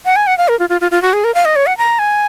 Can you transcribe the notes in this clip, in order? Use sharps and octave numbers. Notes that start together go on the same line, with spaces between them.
F#5
G#5
F#5
F5
A#4
F4
F4
F4
F4
F#4
G#4
A#4
F5
D#5
C#5
F#5
A#5
G#5